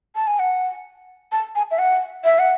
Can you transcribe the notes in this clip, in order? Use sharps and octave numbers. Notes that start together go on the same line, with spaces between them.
A5
G#5
F#5
A5
G#5
E5
F#5
E5
F#5